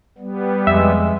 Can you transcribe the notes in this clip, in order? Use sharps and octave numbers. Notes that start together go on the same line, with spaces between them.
G3 B3
F2 G#3 E5